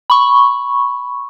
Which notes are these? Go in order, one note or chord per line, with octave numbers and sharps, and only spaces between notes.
B5 C#6